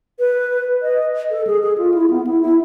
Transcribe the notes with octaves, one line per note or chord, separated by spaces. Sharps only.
B4
D#5
A4
G#4
G#4
F4
E4
B3
E4
E4